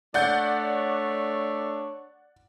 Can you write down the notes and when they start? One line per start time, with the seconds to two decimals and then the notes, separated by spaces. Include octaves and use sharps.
0.14 A3 D4 C#5 D5 F#5 G6